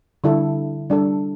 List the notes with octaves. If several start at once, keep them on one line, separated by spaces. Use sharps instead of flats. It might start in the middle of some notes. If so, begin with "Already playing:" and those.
D3 G3 E4 A4
G3 D4 A4